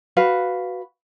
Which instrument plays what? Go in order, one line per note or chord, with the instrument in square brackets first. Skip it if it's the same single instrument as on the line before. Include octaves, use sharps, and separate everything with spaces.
[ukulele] F#4 B4 F5